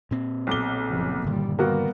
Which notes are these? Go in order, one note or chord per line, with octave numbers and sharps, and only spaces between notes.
A#2 C4
B1 D6 G7
F#1 C#3 F3
G2 A#2 D3 D#3 G3
G3 A#3 B3 F#4